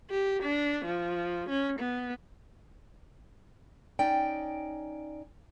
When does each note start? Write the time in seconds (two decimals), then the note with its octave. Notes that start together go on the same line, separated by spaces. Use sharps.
0.10 G4
0.43 D4
0.85 F3
1.49 C#4
1.79 B3
3.99 C#4 D#4 D5 G5